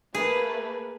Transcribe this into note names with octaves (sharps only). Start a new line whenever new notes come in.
A3 A#3 G#4 B4